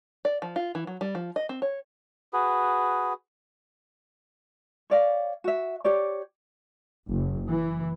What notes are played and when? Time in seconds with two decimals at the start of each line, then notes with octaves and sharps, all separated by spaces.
0.25 D5
0.42 F3
0.56 F4
0.75 E3
0.87 F#3
1.01 G3
1.15 F3
1.36 D#5
1.49 C4
1.62 C#5
2.33 F#4 G#4 B4
4.90 C#5 D5 F5
5.44 F#4 E5
5.84 G4 C#5 D5
7.08 F#1
7.49 E3